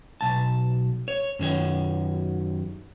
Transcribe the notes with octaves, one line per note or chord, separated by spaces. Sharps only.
B1 A5
C#5
F#2 D#3 C#5